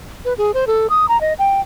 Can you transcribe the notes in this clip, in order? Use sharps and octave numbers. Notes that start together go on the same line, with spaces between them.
B4
G#4
C5
A4
D#6
A#5
D#5
G5